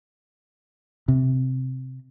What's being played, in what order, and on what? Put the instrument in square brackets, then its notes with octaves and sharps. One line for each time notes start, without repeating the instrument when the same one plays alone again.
[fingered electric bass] C3